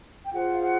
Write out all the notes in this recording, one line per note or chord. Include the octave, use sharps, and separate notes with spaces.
G5
F4 G#4 C5 F#5
F5
F#5